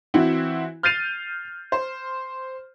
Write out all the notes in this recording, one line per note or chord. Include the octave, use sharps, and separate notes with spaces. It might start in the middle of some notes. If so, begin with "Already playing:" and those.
E3 C4 E4 F#4
F6 G6 A6 C7 D#7 F7
C5